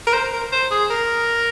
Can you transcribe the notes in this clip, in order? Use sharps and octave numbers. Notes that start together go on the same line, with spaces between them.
A#4
C5
A#4
C5
G#4
A#4